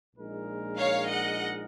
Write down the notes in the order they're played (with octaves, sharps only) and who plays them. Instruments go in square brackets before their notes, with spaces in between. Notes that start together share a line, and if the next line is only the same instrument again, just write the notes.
[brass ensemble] A#1 A#2 G#3 D#4 A#4
[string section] C#5 F5
D#5 F#5